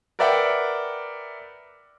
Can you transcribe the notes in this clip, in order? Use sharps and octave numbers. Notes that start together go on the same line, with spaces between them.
A#4 B4 D5 E5 F#5 G5